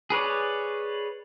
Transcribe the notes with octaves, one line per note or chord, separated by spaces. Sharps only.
G#4 B4 C#5 D5